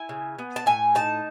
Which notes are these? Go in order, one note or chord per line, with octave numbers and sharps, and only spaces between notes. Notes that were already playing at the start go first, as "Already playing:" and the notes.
Already playing: E4 G#5
C#3
B3
A5
A2 G#5
D#4 A5